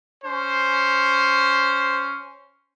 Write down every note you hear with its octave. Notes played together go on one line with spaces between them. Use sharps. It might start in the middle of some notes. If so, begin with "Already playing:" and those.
C#4 C5